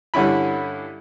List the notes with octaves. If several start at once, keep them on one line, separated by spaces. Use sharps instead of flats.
G2 D3 C#4 E4 B5